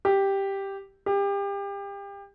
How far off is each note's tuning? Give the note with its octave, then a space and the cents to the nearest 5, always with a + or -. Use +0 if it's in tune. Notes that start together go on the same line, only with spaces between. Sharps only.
G4 +0
G4 +30